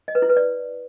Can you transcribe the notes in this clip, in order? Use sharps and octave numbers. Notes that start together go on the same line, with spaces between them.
D#5
B4
E4
B4
D5